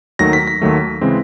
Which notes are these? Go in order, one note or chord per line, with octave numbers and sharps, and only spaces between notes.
D#2 D#3 F#3 A3 A#6
B6
B6
D#2 D#3 F#3 A3
C#3 E3 G#3 C4